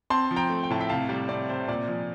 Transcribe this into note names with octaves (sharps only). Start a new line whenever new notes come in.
C4 A5 C6
F3
G5 A#5
A3
G5
A2 A5
E5 G5
C3 F5 A5
G3 D5
C4 D5
C3 C5
A#2 D5
F3